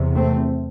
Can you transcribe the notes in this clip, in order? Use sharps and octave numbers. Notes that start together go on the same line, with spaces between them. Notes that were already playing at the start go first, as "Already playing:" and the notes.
Already playing: E2 C3
A3 C4